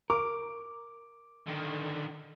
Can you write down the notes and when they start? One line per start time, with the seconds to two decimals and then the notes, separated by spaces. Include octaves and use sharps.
0.10 A#4 D6
1.47 D3 D#3